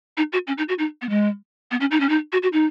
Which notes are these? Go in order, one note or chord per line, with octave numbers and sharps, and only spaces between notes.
D#4
F#4
C#4
D#4
F#4
D#4
B3
G#3
B3
C#4
D#4
C#4
D#4
F#4
F#4
D#4